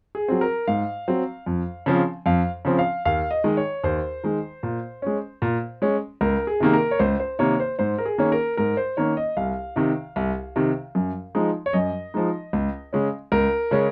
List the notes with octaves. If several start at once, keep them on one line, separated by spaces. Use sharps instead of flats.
G#4
F#3 C4
A#4
G#2 F5
F#3 C4
F2
C#3 F3 C4
F2 F5
C#3 F3 C4
F5
D#2 F5
D#5
D#3 G#3
C#5
D#2 C5
D#3 G#3
A#2
G#3 C#4
A#2
G#3 C#4
C#2 A#4
G#4
C3 D#3 A#3
A#4
C#5
C#2 C5
C5
C3 D#3 A#3 C#5
C5
G#2 C5
A#4
G#4
D#3 A#3 C#4
A#4
G#2 A#4
C5
D#3 A#3 C#4 C#5
D#5
C2 F5
C3 D#3
C2
C3 D#3
F#2
F3 G#3 D#4
C#5
F#2 D#5
F3 G#3 D#4
C#2
C#3 G#3 C#4
C#2 A#4
C#3 G#3 C#4